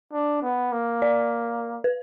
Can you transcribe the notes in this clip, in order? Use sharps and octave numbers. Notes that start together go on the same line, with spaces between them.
D4
B3
A#3
D5
B4